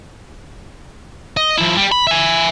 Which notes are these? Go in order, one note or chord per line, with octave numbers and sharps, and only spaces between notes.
D#5
F3 E4
G3
B5
E5 G#5